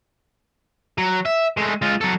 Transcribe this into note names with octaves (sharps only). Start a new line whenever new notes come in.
F#3
E5
G#3 A3
G#3 F4
F#3 A4